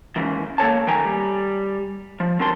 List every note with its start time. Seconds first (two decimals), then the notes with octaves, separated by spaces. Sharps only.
0.16 D#2 G#2 C#3 E3
0.58 A#3 A4 C#5 A5
0.87 A2 D#3 F#3 G5 G#5 A#5
1.04 G3
2.20 F3
2.40 D3 F#3 C4 A#4 A5 C6